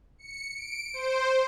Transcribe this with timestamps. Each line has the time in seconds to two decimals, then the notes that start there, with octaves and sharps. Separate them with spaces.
0.18 C#7
0.54 D7
0.94 C5